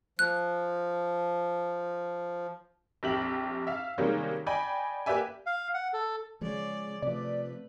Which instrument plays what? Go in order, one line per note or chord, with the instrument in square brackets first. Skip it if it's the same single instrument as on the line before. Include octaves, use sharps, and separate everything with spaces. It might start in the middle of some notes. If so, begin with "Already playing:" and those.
[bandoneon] F3 [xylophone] F#6
[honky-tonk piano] A#1 F2 G4 E5 F#7
E5 F5
C3 D#3 G3 G#3 A#3 C#4
D5 D#5 G5 G#5 B5
A#3 G4 B4 D5 E5 G#5
[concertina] F5
F#5
A4
[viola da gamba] C#3 D5 [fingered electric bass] F3 G#3
[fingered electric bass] C3 F3 [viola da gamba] A3 B4 [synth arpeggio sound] D5